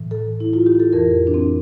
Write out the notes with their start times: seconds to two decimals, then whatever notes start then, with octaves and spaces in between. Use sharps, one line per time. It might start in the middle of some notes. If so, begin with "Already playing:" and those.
Already playing: A2 E3
0.11 A4
0.40 E4
0.53 F4
0.66 G4
0.80 A4
0.93 F2 E3 A#4
1.27 D4
1.34 C4